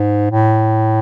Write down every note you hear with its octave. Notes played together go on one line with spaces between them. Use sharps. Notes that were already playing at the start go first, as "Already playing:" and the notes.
Already playing: G#2
A2